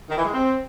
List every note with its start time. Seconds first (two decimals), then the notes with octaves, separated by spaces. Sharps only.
0.09 D#3
0.17 E3
0.24 G#3
0.32 C4